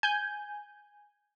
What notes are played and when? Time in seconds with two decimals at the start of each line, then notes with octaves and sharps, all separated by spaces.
0.03 G#5 G6